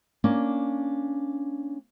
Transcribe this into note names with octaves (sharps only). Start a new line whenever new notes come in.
A#3 C#4 D4